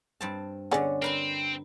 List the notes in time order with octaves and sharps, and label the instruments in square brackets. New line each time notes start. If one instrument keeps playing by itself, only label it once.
[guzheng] G2 C4 A5
[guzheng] D3 C#4 [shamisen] B3 G#4 D5
[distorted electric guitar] C4 [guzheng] A#4 B4 C6